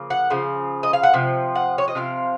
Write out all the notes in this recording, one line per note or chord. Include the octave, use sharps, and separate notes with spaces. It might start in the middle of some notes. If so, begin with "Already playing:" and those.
Already playing: C#3 F3 A#3
F#5
C#3 F3
D#5
F5
F#5
C3 F3
F#5
C#5
D#5
C3 F3 C4 F5